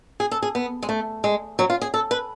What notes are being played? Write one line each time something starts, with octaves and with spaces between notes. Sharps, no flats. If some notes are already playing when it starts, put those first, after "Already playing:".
G#4
A4
G#4
B3
G#3
A3
G#3
F#3
F4
G#4
A4
B4